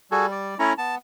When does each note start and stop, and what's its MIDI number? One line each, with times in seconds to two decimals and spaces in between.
0.12 0.55 55
0.12 0.26 66
0.12 0.26 68
0.12 0.26 69
0.32 0.58 74
0.59 0.73 57
0.59 0.73 61
0.59 0.73 64
0.59 0.73 73
0.59 0.73 82
0.78 0.98 59
0.78 0.95 81